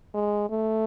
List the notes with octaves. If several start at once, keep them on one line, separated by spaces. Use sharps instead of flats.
G#3
A3